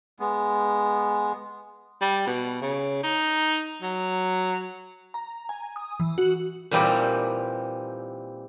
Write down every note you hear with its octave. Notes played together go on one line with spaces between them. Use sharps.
G#3 B3
G3
B2
C#3
D#4
F#3
A#5
G#5
D#6
E3
F#4
A#2 E3 G3 C4 D#4 G4